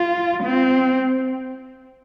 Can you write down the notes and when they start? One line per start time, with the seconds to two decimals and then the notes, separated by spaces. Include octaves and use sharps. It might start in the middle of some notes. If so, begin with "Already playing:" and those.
Already playing: F4
0.43 C4